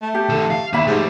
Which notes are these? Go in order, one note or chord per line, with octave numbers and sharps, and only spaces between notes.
A3
G4
D#3 A4
F5
D#3 A#3 E4 E5 B5
G#2 A3 G4